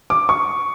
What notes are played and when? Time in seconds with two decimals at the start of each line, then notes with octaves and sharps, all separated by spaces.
0.10 D6
0.29 C#6